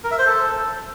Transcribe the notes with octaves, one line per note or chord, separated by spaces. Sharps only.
A#4
E5
C5
A4